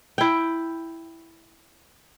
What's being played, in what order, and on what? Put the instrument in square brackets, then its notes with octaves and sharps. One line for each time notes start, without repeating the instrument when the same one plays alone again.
[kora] E4 G5